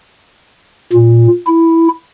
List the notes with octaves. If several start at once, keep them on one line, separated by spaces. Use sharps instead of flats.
A#2
E4